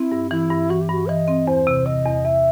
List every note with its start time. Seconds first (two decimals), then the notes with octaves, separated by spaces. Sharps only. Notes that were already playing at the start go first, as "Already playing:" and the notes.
Already playing: C4 E4
0.12 G2
0.31 E3 E4
0.50 G2
0.70 E3 F#4
0.81 G4
0.89 G2 F#4
1.09 E3 D#5
1.28 C4
1.47 E2 C5
1.67 C3
1.86 C3 D#5
2.06 E2
2.25 E2 E5